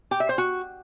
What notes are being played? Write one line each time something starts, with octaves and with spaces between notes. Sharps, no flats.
G4
E5
C5
F#4